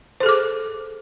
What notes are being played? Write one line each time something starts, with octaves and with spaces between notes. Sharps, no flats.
G#4 A4 C5 D6